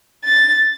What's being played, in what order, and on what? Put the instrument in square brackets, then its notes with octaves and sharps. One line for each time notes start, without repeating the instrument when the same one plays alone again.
[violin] A6